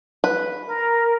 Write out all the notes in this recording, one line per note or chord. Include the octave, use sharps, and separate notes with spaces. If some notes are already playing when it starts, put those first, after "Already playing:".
B4
A#4